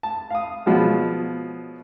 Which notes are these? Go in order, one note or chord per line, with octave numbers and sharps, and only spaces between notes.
A5
F5 D#6
B2 F3 F#3 G#3